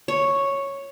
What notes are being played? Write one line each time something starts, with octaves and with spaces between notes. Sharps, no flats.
C#5